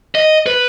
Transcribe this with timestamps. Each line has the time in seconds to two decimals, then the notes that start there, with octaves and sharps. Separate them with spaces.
0.15 D#5
0.46 B4